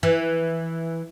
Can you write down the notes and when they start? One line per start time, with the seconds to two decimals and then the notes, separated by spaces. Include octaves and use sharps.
0.03 E3